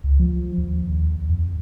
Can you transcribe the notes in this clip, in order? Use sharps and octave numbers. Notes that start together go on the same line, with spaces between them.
C#2
F3
D#2
D#2
F2